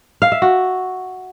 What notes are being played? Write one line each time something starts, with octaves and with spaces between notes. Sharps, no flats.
F5
E5
F#4